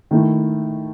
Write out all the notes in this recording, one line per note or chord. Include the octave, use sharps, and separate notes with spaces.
D#3 A3 E4